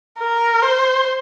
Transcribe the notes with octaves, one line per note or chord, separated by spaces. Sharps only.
A#4
C5